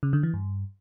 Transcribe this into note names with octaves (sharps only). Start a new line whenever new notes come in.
C#3
D3
E3
G2